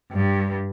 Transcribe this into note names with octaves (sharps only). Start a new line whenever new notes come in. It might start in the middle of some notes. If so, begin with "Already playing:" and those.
G2